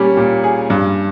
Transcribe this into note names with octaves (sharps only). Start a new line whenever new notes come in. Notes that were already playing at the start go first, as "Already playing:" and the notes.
Already playing: A#2 G3 C#4
A#2
G#4
G2